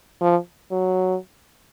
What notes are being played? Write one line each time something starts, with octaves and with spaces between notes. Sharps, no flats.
F3
F#3